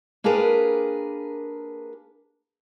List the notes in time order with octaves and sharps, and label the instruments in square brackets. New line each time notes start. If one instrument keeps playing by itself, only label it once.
[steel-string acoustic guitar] A#3 D4 G4 G#4 A#4 B4